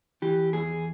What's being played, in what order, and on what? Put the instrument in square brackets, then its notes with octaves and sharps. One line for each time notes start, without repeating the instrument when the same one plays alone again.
[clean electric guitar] E3 G4
E2 G#4